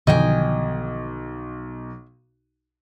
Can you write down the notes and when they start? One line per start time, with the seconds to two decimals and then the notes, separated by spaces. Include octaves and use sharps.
0.07 B1 D3 D#3 F3 D#5 G5 G#5